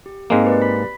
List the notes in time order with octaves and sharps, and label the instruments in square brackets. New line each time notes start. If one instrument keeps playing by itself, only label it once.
[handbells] G4
[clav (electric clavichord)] G#2 G#3 A#3 [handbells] C4 F5
[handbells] G4 B4 D5
B5 B6